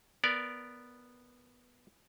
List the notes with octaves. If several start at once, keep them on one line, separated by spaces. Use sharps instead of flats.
B3 A#4 D5